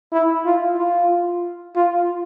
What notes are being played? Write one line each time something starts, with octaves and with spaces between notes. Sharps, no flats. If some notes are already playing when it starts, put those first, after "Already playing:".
E4
F4
F4
F4